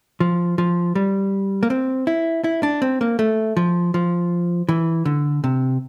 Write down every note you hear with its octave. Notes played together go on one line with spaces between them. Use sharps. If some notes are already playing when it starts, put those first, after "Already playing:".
F3
F3
G3
A#3
C4
E4
E4
D4
C4
A#3
A3
F3
F3
E3
D3
C3